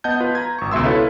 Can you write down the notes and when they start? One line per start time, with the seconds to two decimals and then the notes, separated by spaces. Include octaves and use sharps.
0.04 B3 D#5 F#5 A5 G6
0.20 F4 B4
0.35 A#5 G#6
0.59 G#1 C#6
0.71 C#2 B2 E5 C6 E6
0.83 E4 A4 B4 C#5 E5 F5